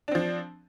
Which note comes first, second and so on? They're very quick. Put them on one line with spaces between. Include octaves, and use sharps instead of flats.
D4 C4 F3